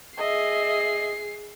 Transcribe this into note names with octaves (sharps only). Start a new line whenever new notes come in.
G#4 D#5 E5 C7